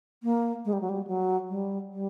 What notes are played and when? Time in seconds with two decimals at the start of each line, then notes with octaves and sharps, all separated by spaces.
0.23 A#3
0.65 G#3
0.73 G3
0.81 F#3
0.89 G3
1.07 F#3
1.49 G3
1.91 G3